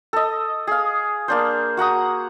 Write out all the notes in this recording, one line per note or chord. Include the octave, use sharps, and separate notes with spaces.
A4 D#5
G#4 F5
A#3 D4 C5
F#4 F#5 A#5 D#6